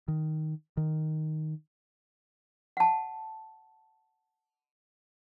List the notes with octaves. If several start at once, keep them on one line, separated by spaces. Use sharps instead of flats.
D#3
D#3
F#5 A5